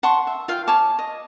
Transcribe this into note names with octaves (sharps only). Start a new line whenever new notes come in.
F#5 A5 C6 C#6
E5
F4 F5 G5
C#5 G#5 A5 D6
D#5